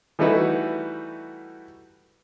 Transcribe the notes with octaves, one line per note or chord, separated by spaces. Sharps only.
E3 G3 A3 D#4 F#4 B4